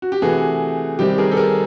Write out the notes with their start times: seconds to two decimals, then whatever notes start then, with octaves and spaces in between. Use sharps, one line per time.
0.02 F#4
0.12 G4
0.22 C3 E3 A3 F#4 G#4
0.99 C3 D#3 G3 C4 G4
1.18 G#4 A#4
1.32 A4
1.37 G#4 A#4